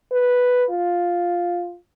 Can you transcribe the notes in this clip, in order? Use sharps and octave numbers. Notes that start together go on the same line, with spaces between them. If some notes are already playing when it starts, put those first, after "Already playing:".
B4
F4